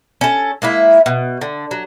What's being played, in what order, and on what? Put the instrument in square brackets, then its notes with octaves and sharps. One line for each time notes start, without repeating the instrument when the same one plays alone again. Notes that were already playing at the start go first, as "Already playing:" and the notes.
[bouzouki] C#4 A4
G#3 A#3 E4 E5
B2
D3
F#3